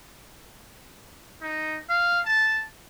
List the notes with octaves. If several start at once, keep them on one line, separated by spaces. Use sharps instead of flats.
D#4
F5
A5